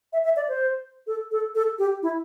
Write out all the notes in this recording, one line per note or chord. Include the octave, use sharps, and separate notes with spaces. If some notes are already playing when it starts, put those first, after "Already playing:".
E5
E5
D5
C5
A4
A4
A4
G4
E4